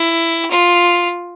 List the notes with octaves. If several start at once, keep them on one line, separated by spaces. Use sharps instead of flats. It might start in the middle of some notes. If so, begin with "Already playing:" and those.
Already playing: E4
F4